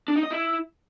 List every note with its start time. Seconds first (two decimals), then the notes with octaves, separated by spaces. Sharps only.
0.08 D4
0.16 D#4
0.23 D#5
0.31 E4